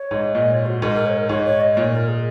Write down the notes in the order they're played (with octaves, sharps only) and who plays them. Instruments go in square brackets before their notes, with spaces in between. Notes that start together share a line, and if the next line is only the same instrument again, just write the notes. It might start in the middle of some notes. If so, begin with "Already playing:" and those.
Already playing: [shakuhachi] C#5
[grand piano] G#2
[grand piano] A#2 [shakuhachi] D#5
[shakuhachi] C#5
F#4
[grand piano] G#2 [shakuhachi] A#4
[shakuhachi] A#4
C#5
A#4
[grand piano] G#2 [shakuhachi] C#5
[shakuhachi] C#5
D#5
D#5
[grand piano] A#2 [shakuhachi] C#5
[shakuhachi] A#4
G#4